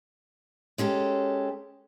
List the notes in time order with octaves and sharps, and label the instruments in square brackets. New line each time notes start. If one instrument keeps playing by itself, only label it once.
[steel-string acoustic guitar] G#3 C#4 G4 A4